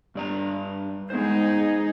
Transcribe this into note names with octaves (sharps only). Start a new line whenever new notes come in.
G2 D5 A#5
G#3 B3 D#4 G#4 C5